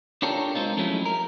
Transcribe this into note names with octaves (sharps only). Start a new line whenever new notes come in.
D4 F4 G4 A4 A#4 C#5
G#3 A#3 C4 D#4 F4
F3 F#3 G#3 A3 C#4 E4
A#4